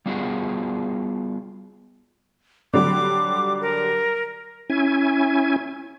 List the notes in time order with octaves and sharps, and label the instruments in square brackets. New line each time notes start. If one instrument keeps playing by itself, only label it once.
[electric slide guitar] G3 B3 F4 F#4 G#4
[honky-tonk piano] D3 F#3 G3 [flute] D6
[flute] A#4
[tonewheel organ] C#4 E4 G#5